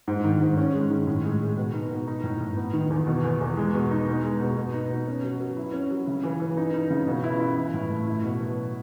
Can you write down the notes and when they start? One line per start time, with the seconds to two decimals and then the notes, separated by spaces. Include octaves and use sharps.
0.08 G#2
0.24 D#3
0.41 G#2
0.57 C#4
0.74 G#3
0.90 D#3
1.07 A2
1.24 G#3
1.41 G#3
1.57 B2
1.74 D#4
1.91 B2
2.07 D#4
2.24 A2
2.41 A2
2.57 B3
2.73 D#3
2.90 E2
3.07 B2
3.24 E2
3.41 E2
3.57 G#3
3.74 B2
3.91 D#4
4.07 B2
4.24 G#3
4.41 B2
4.57 B2
4.74 D#4
4.90 B2
5.07 C#4
5.24 F#3
5.40 F#3
5.57 E4
5.74 C#4
5.91 F#3
6.07 C#3
6.24 E3
6.40 E3
6.57 D#4
6.74 D#4
6.90 C#3
7.07 B2
7.24 E4
7.40 E4
7.58 E3
7.74 A2
7.90 A3
8.07 E4
8.24 B2
8.41 F#3